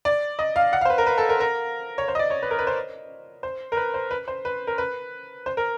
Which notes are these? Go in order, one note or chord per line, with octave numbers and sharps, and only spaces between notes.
D5
D#5
F5
F#5
F5
C5
B4
A#4
B4
A4
A#4
A#4
C#5
C5
D#5
D5
C#5
B4
A#4
B4
C5
C5
A#4
B4
C5
B4
C5
B4
A#4
B4
C5
A#4